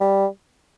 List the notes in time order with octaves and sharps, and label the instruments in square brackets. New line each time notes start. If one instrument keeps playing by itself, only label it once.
[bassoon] G3